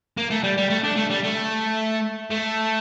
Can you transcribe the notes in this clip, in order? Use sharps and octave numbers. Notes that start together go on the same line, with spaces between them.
A#3
A3
G3
G3
A3
D4
A3
G3
A3
A3